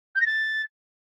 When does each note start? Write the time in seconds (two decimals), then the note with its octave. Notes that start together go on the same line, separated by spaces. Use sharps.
0.15 G6
0.21 A#6
0.26 A6